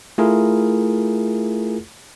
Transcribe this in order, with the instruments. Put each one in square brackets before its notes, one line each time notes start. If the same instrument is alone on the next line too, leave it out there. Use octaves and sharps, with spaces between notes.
[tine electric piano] A3 E4 F4 G#4 A#4